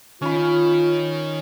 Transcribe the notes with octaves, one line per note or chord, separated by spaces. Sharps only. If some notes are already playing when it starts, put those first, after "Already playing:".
D#3 C#4 F4 B5